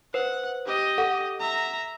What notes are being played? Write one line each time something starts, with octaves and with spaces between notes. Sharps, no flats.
B4 C5 F#5
G4 D#5
A4 F#5
E5 A#5